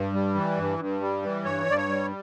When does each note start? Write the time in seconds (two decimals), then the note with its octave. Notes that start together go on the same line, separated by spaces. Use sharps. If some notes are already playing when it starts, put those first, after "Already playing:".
Already playing: G2
0.13 G3
0.35 E3
0.57 G2
0.79 G2
1.01 G3
1.22 E3
1.44 G2 C#5
1.66 G2 D5
1.77 C#5
1.88 G3